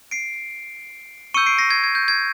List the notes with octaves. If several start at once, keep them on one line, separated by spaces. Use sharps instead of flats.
C7 D7
C#6 E6 G6 C#7 D#7
C7 D7
A#6 C7
G#6
G#6
G6
G#6